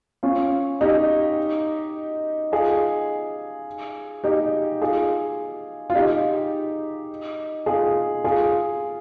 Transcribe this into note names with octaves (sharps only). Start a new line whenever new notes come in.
C#4 F4
D#4 G4
F4 G#4
D#4 G4
F4 G#4
F4
D#4 G4
F4 G#4
F4 G#4